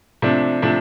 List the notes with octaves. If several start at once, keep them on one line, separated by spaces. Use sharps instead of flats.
C3 F3 A3 D4
C3 F3 A3 D4